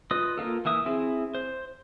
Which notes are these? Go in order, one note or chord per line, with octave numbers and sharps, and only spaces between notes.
F4 B4 D#5 D#6
A#3 D4 F4 A4
E3 A#3 E5 D#6
C4 E4 G#4
C5